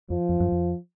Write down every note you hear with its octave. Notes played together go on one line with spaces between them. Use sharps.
F2 F3
F2
F#2
F2